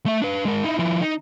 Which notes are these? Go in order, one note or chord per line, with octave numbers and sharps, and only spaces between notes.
A3 E5
D4 B4
G#3 A#4
D#4 E4
F3 E4
D#4